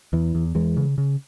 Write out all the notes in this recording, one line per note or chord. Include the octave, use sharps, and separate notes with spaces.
E2 E3
E2
E2 E3 G#3
C#3
C#3